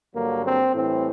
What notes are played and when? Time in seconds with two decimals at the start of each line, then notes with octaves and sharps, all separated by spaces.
0.14 G2 D3 F#3 A#3
0.44 C4
0.74 A2 E3 G3 C4